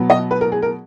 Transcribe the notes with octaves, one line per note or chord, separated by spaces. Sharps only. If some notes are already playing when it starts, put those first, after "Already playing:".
Already playing: B2 F#3 B3
D#5
B4
A#4
G#4
A#4